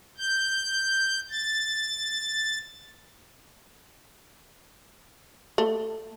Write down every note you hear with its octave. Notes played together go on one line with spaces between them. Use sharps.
G6
A6
A3